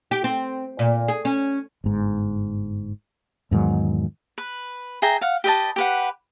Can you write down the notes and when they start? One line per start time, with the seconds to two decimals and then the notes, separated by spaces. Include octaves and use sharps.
0.11 G4
0.24 C4
0.79 A#2
1.08 G#4
1.25 C#4
1.84 G1 G#2
3.51 E2 G#2 D#3 F#3
4.38 B4
5.02 G#4 E5 G5 A#5
5.21 F5 F#5
5.44 G4 B4 D#5 A5
5.76 G4 B4 F#5